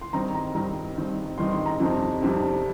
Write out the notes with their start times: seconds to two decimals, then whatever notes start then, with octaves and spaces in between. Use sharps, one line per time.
0.01 C6
0.13 G2 D#3 C4 D#4 A#5
0.35 A#5
0.55 G2 D#3 C4 D#4 A#5
0.97 G2 D#3 C4 D#4
1.38 G2 D#3 C4 D#4 C6
1.52 C6
1.66 A#5
1.80 F2 C3 G3 C4 D#4
2.22 F2 C3 G3 C4 D#4